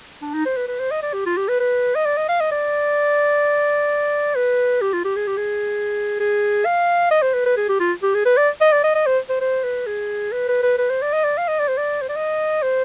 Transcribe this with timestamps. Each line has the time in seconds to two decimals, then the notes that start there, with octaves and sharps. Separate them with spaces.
0.22 D4
0.34 D#4
0.46 C5
0.57 B4
0.68 B4
0.80 C5
0.91 D#5
1.02 D5
1.13 G4
1.26 F4
1.37 G4
1.48 B4
1.60 B4
1.95 D#5
2.06 D5
2.18 D#5
2.29 F5
2.40 D#5
2.52 D5
4.36 B4
4.82 G4
4.93 F4
5.05 G4
5.16 G#4
5.27 G4
5.37 G#4
6.20 G#4
6.65 F5
7.11 D#5
7.22 C5
7.34 B4
7.46 B4
7.57 G#4
7.69 G4
7.80 F4
8.03 G4
8.15 G#4
8.26 B4
8.37 D5
8.61 D#5
8.72 D5
8.84 D#5
8.95 D#5
9.06 C5
9.29 C5
9.41 C5
9.64 B4
9.87 G#4
10.32 B4
10.49 B4
10.63 B4
10.78 B4
10.90 C5
11.02 D5
11.13 D#5
11.24 D5
11.38 F5
11.48 D#5
11.60 D5
11.68 C5
11.78 D5
12.02 C5
12.09 D5
12.16 D#5
12.62 C5